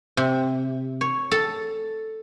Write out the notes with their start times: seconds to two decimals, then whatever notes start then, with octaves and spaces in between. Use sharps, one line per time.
0.17 C3
1.01 C#5
1.31 A4